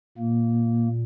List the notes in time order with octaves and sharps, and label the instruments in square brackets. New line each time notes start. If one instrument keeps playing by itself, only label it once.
[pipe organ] A#2 A#3